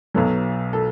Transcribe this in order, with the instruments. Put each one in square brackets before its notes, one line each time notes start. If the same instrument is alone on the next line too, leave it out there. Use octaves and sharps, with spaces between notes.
[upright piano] B1 B2 F#3 A4
A4